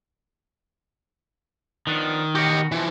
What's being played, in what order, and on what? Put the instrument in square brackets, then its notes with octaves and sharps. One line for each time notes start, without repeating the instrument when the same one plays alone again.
[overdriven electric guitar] D#3 [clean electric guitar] F3 B3 D4
[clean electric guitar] B2 F#4 [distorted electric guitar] G4 D#5
[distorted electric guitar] E3 F3